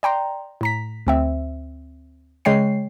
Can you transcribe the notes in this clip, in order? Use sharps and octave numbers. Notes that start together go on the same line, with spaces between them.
D5 G5 A#5 C6
A2 A#5 B6
D2 C4 E5
C#3 G#3 C#5 G5 C7